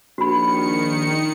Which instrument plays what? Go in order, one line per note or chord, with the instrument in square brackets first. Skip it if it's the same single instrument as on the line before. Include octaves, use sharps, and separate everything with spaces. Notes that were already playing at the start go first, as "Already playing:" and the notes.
[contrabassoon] A#1 [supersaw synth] D#3 C#7 [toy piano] F#4 B5